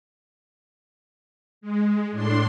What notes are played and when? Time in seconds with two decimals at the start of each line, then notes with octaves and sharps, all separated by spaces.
1.61 G#3
2.11 A2 D4 C6